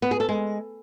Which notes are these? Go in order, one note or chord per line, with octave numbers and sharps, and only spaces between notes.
B3
G#4
A4
G#3